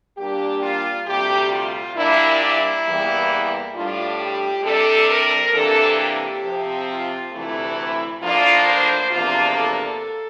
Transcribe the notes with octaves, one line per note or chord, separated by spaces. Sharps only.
A#2 G3 A#3 D4 G4
F4
D2 C3 G3 G4
F4
A#2 G3 A#3 D4 E4
E4
E2 E3 G3 A#3
A2 G3 D4 F4
G4
C3 G3 D4 A4
A#4
C3 E3 A#3 D4 A4
G4
C3 F3 C4
F4
D2 C3 E3 A3 E4
A2 F3 A#3 D4 F4
C5
E2 C3 F3 A#3 D4 F4
A4